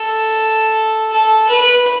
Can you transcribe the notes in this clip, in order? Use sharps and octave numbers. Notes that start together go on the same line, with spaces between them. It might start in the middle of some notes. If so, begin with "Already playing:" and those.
Already playing: A4
A4
B4